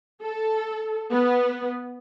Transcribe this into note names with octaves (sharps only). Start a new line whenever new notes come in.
A4
B3